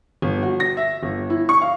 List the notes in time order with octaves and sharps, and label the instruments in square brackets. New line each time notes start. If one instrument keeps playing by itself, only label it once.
[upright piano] G1
F#4
A#6
E5
G1
E4
C#6
F5